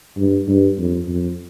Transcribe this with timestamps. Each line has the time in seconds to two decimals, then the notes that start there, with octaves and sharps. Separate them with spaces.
0.17 G2
0.48 G2
0.78 F2
1.08 F2